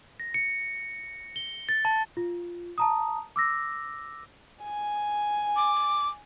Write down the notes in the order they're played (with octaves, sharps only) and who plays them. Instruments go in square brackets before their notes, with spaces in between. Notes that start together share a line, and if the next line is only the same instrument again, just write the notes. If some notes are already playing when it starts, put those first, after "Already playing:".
[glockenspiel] A#6
C#7
G7
A6
A5
[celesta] F4
A5 A#5 D#6
D6 E6 A#6
[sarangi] G#5
[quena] D6